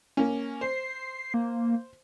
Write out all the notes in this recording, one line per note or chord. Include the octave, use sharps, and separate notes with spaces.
A#3 C#4
C5 C7
A#3